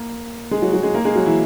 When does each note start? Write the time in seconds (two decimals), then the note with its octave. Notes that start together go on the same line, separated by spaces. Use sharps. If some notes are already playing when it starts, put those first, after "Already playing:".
Already playing: A#3 A#4
0.51 G#3 G#4
0.62 F#3 F#4
0.73 F#3 F#4
0.83 G#3 G#4
0.94 A#3 A#4
1.05 G#3 G#4
1.15 F#3 F#4
1.26 E3 E4